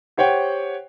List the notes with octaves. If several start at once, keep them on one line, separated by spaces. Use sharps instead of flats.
G4 C5 C#5 F#5 G5